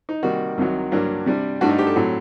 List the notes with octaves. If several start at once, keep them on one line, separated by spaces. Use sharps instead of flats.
D#4
C3 D#3 G3 A#3 F#4
C2 C3 D#3 F#3
G2 F#3 A#3 D4
C3 G3 D4
G2 D3 A3 D4 F#4
D#4
G4
A4
A2 F#3 C4